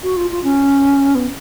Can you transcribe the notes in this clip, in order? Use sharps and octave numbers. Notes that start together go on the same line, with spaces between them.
F#4
F4
F4
C#4
B3